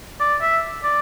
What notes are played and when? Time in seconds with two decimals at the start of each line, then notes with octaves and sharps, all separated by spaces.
0.20 D5
0.41 E5
0.84 D5